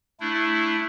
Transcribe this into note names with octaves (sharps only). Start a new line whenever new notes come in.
A3 D4 E4